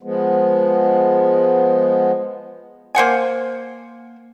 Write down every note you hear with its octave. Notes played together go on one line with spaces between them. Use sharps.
F3 G#3 B3
A#3 C5 F#5 G#5